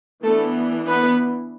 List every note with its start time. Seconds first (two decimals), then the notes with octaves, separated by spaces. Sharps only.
0.23 E3 A3 B3 D4 A4
0.87 B3 B4